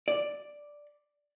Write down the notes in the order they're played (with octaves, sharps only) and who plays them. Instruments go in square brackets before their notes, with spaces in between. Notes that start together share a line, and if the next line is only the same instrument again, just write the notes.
[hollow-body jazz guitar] D5